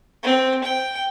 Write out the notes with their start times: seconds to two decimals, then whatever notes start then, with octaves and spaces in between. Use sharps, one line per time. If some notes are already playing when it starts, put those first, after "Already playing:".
0.23 C4
0.64 G5